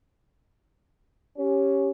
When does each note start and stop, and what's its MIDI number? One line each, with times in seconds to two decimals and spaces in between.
1.38 1.91 61
1.38 1.90 67